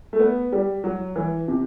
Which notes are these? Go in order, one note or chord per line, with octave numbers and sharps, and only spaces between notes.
A3
B3
G3
F#3
E3
C3